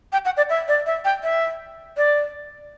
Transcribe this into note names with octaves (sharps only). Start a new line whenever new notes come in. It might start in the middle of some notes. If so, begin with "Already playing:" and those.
G5
F#5
D5
E5
D5
E5
G5
E5
D5